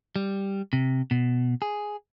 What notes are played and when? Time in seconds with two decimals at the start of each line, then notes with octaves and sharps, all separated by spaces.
0.16 G3
0.73 C3
1.11 B2
1.62 G#4